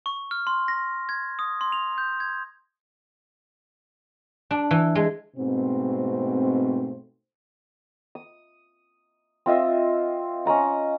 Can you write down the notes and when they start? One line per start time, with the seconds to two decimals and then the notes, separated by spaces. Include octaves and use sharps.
0.06 C#6
0.31 F6
0.47 C6
0.68 A#6
1.09 G#6
1.39 D#6
1.61 C6
1.72 F7
1.98 G6
2.20 G#6
4.51 D4
4.71 E3
4.95 G#3
5.37 G#2 B2 A3 C4
8.15 D#6
9.46 C4 F4 D#5 E5
10.45 C#4 D#5 A#5 C#6